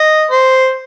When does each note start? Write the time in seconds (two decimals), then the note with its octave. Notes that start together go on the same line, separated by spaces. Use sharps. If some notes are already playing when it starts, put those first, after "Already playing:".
Already playing: D#5
0.31 C5